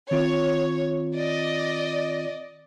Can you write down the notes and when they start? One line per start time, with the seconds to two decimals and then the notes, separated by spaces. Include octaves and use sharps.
0.11 D#3 C4 F4 C#5
1.14 D5 D#5